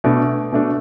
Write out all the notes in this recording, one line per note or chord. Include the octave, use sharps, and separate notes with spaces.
B2 A3 D4
B2 A3 D4